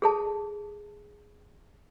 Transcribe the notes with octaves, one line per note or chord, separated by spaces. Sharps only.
G#4 A4 A5